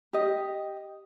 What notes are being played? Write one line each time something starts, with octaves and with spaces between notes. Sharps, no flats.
G4 D#5